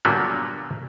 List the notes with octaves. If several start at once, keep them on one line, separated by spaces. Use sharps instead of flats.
A#2 D3 F#3 G3 A#3 B3